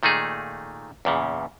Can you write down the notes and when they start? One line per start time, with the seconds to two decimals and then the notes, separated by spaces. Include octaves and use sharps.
0.03 A#2 D#3 A3 D#4 G#4
1.05 E2 A#2 C#3